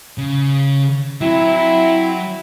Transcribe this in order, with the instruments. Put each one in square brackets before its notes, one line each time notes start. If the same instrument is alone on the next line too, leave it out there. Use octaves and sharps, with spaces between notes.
[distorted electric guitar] C#3
[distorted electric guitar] F#3 [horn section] C4 E4